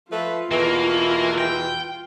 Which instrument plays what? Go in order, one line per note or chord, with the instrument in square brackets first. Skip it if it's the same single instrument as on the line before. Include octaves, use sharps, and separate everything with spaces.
[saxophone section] F3 A3 B4 [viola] F4
[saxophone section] E2 B2 E3 [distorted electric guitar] A#3
[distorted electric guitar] G5